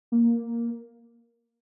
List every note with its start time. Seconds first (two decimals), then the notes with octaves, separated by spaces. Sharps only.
0.12 A#3